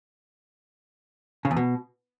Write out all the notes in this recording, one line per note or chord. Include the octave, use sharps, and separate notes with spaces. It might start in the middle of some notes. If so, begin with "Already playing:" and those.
C#3
E2
B2